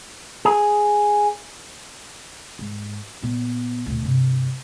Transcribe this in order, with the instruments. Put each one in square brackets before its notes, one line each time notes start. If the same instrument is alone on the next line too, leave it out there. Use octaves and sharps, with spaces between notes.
[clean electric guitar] G#4
[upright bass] G#2
A#2 B3
D2 A#2
G2 C3